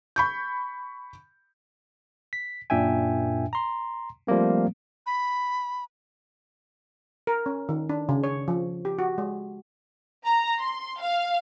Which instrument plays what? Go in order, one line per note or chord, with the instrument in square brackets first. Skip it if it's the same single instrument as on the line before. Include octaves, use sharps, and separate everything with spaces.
[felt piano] B5 C#6 G6
[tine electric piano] B6
F#2 A#2 D4 E5 G5 G#5
A#5 C6
F3 G3 A3 A#3 C4
[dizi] B5
[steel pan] A#4
C#4
D#3
D4
C#3
C#5
F3
G4
F#4
G#3
[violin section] A#5
C6
F5